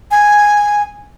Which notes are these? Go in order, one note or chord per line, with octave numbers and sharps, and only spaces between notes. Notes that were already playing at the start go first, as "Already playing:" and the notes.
G#5